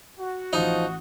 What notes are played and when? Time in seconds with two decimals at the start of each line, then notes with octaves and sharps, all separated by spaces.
0.19 F#4
0.53 A1 F3 D#4 D#6 G7